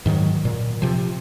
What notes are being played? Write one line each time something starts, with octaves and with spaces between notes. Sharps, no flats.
G#2 D#3 F3 F#3
A#2
C3 F3